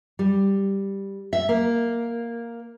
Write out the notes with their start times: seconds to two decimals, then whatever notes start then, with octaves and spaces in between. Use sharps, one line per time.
0.19 G3
1.33 E5
1.49 A#3